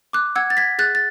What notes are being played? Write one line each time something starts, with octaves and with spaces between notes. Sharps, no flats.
D6 F#6
F#5 E6 G#6
A6
G#6 B6
G#4 F#6 A6
A6